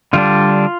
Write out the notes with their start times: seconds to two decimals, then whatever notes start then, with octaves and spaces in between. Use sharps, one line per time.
0.13 D3 G3 D4 F4